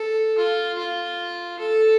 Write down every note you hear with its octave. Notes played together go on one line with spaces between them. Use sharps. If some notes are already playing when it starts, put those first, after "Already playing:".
Already playing: A4
F4
F4
A4